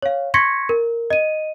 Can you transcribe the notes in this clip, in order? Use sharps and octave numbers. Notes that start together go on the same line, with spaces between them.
C#5 F5
C6 C#6 G#6 A#6 B6 C#7
A#4
D#5 D#7